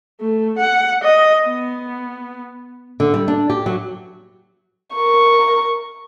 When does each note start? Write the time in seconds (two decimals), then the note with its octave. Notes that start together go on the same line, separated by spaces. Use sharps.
0.21 A3
0.58 F#5
1.04 D#5
1.47 B3
3.00 D3
3.14 G3
3.28 D4
3.50 G4
3.66 F#3
4.95 A#4 C#6